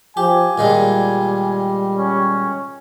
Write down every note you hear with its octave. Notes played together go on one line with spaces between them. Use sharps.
F3 G4 G#5
A#2 D#3 G3 G#3
C#4